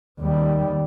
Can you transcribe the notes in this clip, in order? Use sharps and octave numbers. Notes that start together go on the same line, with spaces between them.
D#2 G3